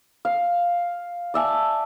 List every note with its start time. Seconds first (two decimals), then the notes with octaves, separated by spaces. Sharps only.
0.25 F5
1.34 D5 E5 G#5 A5